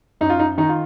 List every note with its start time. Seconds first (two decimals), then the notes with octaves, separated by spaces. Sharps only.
0.21 F#2 D#4
0.30 F4
0.39 D#4
0.58 D#3 D#4
0.69 F4